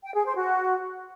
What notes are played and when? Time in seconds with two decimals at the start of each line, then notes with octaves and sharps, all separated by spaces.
0.04 G5
0.15 G#4
0.25 C5
0.36 F#4